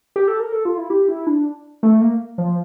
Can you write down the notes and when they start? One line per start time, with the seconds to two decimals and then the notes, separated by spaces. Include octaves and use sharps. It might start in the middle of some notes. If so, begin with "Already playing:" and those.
0.16 G4
0.28 A4
0.40 A#4
0.52 A4
0.65 F4
0.78 E4
0.90 G4
1.08 E4
1.27 D4
1.83 A3
2.01 A#3
2.38 F3